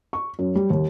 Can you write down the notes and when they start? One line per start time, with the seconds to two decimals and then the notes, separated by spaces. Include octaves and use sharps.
0.13 C#6
0.39 F#2
0.55 G3
0.70 D#2